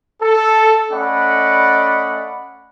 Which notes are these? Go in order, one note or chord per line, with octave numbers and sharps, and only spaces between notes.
A4
A3 C#4 D5 D#5 F#5 B5